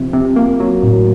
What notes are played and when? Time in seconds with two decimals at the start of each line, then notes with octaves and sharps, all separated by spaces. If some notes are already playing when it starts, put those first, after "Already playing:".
Already playing: C3 F3
0.13 C3
0.36 A#3
0.60 F#3
0.83 A2